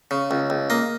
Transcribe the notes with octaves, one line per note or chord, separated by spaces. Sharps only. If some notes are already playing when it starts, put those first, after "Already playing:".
C#3
C#2
C#2
A#3 D#5